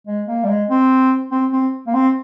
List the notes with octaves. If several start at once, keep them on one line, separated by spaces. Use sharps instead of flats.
G#3
A#3
G3
G#3
C4
C4
C4
A#3
C4